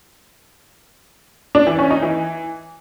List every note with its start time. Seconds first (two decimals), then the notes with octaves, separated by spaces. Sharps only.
1.55 D4
1.67 E3
1.79 C#4
1.91 D#4
2.03 E3